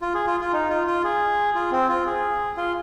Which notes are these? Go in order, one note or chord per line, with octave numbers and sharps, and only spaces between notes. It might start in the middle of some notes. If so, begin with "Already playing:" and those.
F4
G#4
F4
F4
D#4
F4
F4
G#4
F4
C4
F4
G#4
F4